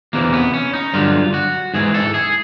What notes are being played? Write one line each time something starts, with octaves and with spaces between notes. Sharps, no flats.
E2 C3 E3 A#3
B3
C#4
D#4
G2 D3 F#3 F4
F#4
G#2 E3 G#4
A4
G#4